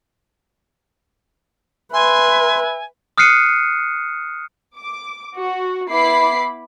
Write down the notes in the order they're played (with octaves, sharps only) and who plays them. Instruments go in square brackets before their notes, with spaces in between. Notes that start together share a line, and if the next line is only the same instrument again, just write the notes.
[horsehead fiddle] B4 [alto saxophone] E5 [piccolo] G#5 [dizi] C6
[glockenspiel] D#6 F6 F#6 C7 C#7 D#7
[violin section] D6
F#4
B3 E4 B5 D6 C7